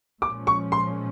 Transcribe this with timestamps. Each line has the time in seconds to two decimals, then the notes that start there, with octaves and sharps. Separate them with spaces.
0.22 A#2 F3 G#3 C#4 D6
0.47 C#6
0.72 C6